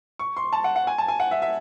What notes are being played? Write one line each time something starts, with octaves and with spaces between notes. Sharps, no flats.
C#6
C6
A5
F#5
F#5
G#5
A5
G#5
F#5
E5
E5